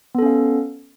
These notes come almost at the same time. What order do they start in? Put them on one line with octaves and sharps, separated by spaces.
B3 A4 C#4 F5